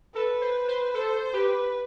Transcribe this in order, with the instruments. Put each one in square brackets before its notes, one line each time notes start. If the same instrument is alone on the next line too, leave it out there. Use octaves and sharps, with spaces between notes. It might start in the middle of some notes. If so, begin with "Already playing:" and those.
[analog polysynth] A4 [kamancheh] B4
[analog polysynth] C5
C5
[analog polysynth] A4 [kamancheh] C5
[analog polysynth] G4 [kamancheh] B4